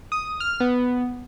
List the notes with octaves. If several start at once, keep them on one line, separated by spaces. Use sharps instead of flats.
D#6
F6
B3